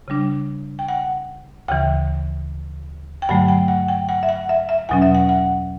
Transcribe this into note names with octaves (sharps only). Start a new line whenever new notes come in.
C#3 G3 D4
G5
F#5
D2 C#3 E3 G5
G5
G2 D3 F#3 A3 F#5
G5
F#5
G5
F#5
E5
F#5
E5
E5
E2 B2 F#3 C#4 F#5
E5
F#5
F#5